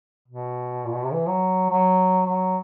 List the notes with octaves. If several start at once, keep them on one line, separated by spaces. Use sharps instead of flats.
B2
A#2
B2
C3
E3
F#3
F#3
F#3